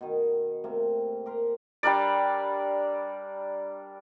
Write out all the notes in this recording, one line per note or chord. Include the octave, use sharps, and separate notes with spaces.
B2 D#3
C3 A3 A#3
G4 A#4 C6
G3 D4 A#4 D5